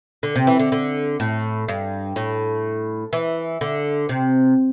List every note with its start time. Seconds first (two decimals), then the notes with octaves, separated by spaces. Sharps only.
0.23 D3
0.36 C3
0.47 E3
0.59 D3
0.72 D3
1.20 A2
1.68 G2
2.16 A2
3.13 E3
3.61 D3
4.09 C3